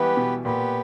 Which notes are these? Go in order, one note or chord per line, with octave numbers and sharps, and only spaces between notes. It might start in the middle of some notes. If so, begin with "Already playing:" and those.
Already playing: E3 G3 G#3 B3 G4 B4
B2
A#2 B3 G4 B4